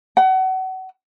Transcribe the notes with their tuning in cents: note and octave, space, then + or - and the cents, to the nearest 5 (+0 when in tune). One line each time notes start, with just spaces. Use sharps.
F#5 +30